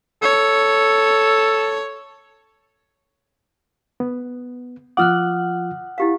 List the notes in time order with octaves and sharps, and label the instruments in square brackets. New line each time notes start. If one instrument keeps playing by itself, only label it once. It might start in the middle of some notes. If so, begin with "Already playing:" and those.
[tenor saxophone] A4 [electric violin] C#5
[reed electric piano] B3
[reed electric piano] F3 F4 D6 [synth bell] F#5 [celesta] D#6 F6 F#6
[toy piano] E4 G4 F5